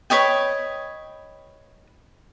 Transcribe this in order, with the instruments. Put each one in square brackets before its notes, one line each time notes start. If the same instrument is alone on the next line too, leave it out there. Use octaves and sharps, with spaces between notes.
[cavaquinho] B4 C#5 D#5 G5